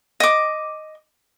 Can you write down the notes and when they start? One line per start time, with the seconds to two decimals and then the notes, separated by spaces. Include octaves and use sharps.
0.20 D#5 D6